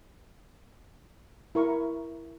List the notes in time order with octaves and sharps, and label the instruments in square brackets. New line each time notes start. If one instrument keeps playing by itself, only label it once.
[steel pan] E4 A#4 C#6